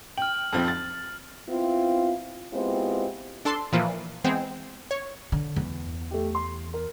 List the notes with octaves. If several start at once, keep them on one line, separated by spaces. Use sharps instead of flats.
G5 F6 F#7
F2 F3 C4
A6
B3 C4 E4 F4
G#3 B3 C4 E4 F4 G4
D4 A4 A5 C6
A#2 E3 F3 A#3
E3 G#3 B3 C4
C#5
D3
E2
A3 G4
C6
A#4